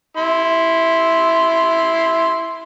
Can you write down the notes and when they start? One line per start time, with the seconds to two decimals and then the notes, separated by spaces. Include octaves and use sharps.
0.17 E4 C6